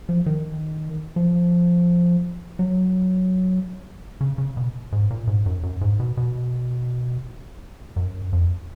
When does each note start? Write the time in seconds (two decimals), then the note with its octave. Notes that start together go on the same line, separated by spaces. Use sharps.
0.09 F3
0.26 D#3
1.16 F3
2.59 F#3
4.21 C#3
4.38 C#3
4.57 B2
4.92 G#2
5.11 A#2
5.27 G#2
5.46 F#2
5.63 F#2
5.81 G#2
6.00 B2
6.17 B2
7.96 F#2
8.33 F2